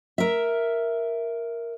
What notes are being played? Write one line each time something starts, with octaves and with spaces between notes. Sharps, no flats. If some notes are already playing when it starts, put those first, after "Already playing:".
A#4 E5